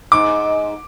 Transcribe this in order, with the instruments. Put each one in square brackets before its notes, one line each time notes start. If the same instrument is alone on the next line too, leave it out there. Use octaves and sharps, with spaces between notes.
[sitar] G#2 [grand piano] D6